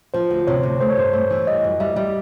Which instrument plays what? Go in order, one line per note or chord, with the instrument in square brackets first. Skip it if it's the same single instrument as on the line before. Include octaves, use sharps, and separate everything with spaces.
[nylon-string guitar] F3 [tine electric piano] C5
[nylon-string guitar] D2
[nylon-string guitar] C3 [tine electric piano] C#5
[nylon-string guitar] D2
[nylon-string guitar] A3 [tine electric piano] C5
[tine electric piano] C#5
[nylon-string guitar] G2 [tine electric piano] C5
[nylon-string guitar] A3
E3
[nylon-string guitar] G3 [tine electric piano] D#5
[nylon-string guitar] F#2
[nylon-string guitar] G3 [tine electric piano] E5
[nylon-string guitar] G3